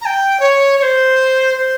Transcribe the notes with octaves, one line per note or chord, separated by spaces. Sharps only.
A#5
G5
C#5
C#5
C5
C5